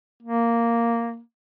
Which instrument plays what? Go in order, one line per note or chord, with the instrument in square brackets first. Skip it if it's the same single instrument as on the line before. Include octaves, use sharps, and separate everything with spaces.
[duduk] A#3